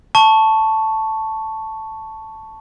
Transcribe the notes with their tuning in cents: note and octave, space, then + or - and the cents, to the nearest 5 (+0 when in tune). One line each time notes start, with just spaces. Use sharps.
A5 +0 C#6 +0